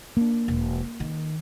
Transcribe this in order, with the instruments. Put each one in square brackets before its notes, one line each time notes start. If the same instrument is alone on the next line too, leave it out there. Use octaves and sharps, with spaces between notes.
[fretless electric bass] A#3 D4
[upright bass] E1
D#3